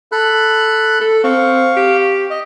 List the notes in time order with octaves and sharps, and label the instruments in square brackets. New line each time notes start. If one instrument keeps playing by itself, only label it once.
[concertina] A4 B5 F#6
[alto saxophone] A4
[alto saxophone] C4 [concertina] F5 C#6
[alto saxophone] G4
[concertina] D#5